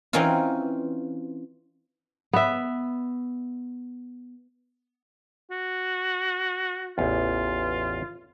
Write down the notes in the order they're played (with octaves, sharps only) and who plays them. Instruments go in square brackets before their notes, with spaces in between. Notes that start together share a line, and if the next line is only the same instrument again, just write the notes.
[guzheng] E3 C4 C#4 D#4 F4
[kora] B3 E5
[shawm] F#4
[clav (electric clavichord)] A1 E2 [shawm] F4